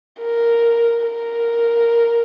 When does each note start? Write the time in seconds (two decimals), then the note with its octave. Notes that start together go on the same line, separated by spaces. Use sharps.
0.20 A#4
1.02 A#4